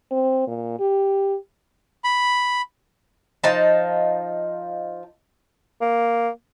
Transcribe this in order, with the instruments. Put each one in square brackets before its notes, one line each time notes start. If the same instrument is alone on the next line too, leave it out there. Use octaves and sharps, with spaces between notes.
[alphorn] C4
A#2
G4
[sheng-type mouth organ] B5
[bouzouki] F3 D#4 A5
[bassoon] A#3